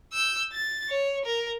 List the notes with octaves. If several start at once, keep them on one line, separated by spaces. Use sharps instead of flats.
E6 G6
A6
C#5
A#4